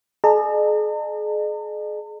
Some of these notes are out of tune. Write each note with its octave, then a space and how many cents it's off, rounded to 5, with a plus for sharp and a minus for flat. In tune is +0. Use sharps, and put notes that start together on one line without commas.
G#4 +40 D#5 -45 A#5 -45